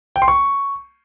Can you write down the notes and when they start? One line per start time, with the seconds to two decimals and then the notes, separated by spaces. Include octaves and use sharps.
0.16 G5
0.22 C6
0.28 C#6